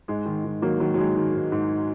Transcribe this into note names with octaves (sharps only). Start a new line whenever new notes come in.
G#2 G#3
D#3
D#3
D#3 F#3 A#3
D#3 F#3
F#3
D#3 G#3
D#3
G#2
G#2